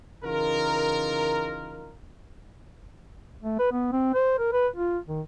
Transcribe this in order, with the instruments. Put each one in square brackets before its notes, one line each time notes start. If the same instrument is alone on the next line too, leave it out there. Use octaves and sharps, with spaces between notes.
[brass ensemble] C#3 E3 D#4 F4 A#4
[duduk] A3
B4
B3
C4
C5
A#4
B4
F4
D#3